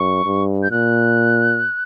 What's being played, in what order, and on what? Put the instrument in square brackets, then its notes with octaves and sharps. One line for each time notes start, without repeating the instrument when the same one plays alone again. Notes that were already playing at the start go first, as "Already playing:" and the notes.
Already playing: [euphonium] F#2 [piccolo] C#6
[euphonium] G2
[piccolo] G6
[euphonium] A#2 [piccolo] F#6